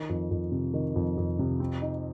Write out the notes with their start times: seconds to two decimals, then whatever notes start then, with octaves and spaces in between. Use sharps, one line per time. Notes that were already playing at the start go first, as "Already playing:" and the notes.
Already playing: D#3
0.09 F2
0.31 F2
0.52 C3
0.74 D#3
0.96 F2
1.17 F2
1.39 C3
1.60 C4
1.82 D#4